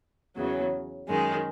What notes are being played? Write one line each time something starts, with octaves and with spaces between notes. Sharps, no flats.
E2 C#3 F#3
F#2 D#3 G#3